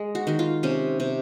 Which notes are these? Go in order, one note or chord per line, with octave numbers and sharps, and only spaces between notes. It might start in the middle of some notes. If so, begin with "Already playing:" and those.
Already playing: G#3
F#4
D#3 F#4
F4
C3 C#4
C3